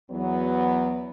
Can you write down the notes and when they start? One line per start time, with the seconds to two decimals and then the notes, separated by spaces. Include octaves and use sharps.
0.10 E2 F#3 B3